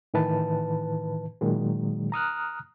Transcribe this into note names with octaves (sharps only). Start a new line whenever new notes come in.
A2 D#3 E3 B4 A5
A#2 D#3 F#3 G#3
A#5 D#6 F6 F#6